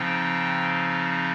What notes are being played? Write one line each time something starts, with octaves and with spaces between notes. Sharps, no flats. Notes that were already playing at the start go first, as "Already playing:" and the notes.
Already playing: C#3 F3 C4 D#4 G5